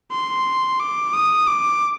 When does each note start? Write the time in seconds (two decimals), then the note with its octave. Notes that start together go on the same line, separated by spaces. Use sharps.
0.11 C6
0.80 D6
1.13 D#6
1.47 D6